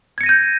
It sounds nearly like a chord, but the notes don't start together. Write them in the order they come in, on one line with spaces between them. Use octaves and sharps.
G#6 C#7 A#6 D#7 G6